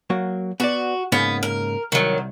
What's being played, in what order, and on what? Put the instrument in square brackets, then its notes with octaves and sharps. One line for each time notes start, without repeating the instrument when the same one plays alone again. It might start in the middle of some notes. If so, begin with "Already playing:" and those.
[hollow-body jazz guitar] F#3 A#3 F#4
[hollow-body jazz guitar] B3 D5 [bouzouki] F#4
[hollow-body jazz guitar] G#2 C#3 A#3 [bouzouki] B3
[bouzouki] A#4
[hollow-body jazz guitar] C2 [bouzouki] D#3 F#3